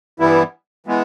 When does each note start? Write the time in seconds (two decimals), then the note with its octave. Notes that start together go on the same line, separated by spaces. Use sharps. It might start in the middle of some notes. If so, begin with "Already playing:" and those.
0.19 G2 E3 G3 B3 E4
0.86 E3 G#3 B3